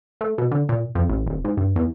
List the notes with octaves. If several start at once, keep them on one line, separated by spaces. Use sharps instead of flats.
A3
B2
D3
A#2
F2
A1
D#1
G#2
G2
E2